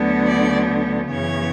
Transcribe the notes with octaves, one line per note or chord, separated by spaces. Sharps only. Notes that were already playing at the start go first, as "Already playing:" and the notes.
Already playing: D2 D3 F#3 B3
D5
F#2 C#3 E3 B3 C#5